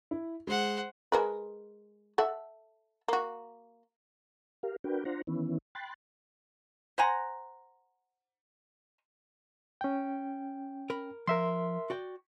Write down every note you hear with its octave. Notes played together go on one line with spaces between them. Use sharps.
E4
G#3 C5 F#5
G#3 A#4 B4
A4 E5 F#5
A#3 F#4
G4 A#4 F5
D4 F#4 A#4 B4 G5
D4 F4 C5 F#5 A#5
D#3 E3 B3 C#4 E4
G5 B5 C6 F#6 A6
C5 F#5 G#5 A#5
C#4 G5
A#4 B5
F3 A#4 E5 C6
F#4 D5 G5